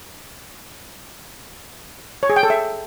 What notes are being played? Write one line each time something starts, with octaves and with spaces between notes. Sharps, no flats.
C#5
G#4
G5
A4
E5